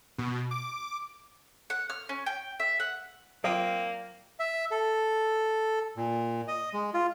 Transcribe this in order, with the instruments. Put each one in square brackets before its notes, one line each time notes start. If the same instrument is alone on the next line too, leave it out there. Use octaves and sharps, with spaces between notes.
[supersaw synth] B2
D6
[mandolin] F#5
F6
C#4
G5
E5
F#5
[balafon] F#3 F4 [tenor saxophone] A#3 [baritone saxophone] C4 [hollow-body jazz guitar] D5 F5
[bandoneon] E5
A4
A#2
D#5
G#3
F4